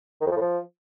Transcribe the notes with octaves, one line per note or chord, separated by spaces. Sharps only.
D#3
F2
F3
A2
F3